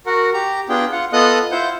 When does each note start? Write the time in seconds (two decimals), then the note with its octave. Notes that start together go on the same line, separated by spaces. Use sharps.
0.06 F#4 A#4 F#5
0.34 G4 A#5
0.69 B3 D4 F4 G#4 G5
0.92 F4 F#5
1.13 B3 F4 A4 D#5 D#6 F#6
1.51 E4 F4 C5 F#5 G6